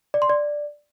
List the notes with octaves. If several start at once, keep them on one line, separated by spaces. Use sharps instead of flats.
D5
C6
D5